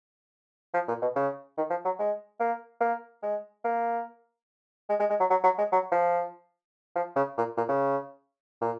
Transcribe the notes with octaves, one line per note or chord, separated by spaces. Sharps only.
F3
A#2
B2
C#3
D#3
F3
F#3
G#3
A#3
A#3
G#3
A#3
G#3
G#3
G#3
F#3
F#3
F#3
G#3
F#3
F3
F3
C#3
A#2
A#2
C#3
A#2